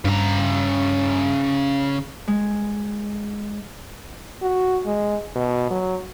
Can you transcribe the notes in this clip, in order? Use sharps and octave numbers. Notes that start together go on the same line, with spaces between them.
G2 C#3 A#5
G#3
F#4
G#3
B2
F#3